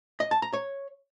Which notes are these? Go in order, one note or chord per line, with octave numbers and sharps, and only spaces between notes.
D#5
A5
A#5
C#5